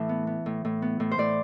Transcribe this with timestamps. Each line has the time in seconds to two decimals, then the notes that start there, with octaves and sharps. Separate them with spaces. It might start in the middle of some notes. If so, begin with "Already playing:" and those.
Already playing: A2 E3 E5 A5
0.09 B3
0.27 B3
0.46 A2
0.65 A2
0.82 B3
1.00 A2
1.11 C5
1.18 A2 D5